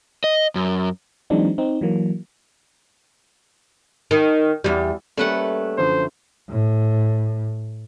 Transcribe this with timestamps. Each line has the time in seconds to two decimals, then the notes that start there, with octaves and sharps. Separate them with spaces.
0.24 D#5
0.55 F#2
1.30 E3 F#3 G#3 C4 D4 D#4
1.58 C4 D#4
1.81 E3 F#3 A#3
4.11 D#3
4.64 E2 G3
5.17 G3 A3 A#3 C#4 B4 F#5
5.78 F#2 D3 F3 C5
6.49 A2